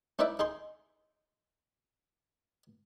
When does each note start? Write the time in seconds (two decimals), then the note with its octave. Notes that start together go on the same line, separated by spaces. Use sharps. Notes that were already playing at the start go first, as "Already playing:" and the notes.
0.19 C#4 D#4 E4 B4 D5 E5
0.39 D#4 G#4 C6